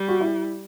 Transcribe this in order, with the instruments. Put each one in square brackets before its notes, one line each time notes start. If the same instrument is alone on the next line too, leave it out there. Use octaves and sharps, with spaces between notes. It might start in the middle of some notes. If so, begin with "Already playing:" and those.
Already playing: [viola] G3
[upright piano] F#4
E4